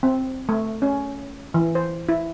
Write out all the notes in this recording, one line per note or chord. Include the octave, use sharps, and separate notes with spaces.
C4
A3
C#4
E3
C5
E4